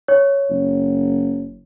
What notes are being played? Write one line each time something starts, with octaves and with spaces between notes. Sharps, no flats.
C#5
F#1